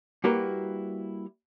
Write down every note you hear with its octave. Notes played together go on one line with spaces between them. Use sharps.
G3 A#3 E4 F#4 A#4 B4